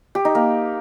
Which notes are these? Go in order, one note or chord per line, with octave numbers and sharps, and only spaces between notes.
G4
D#4
A#3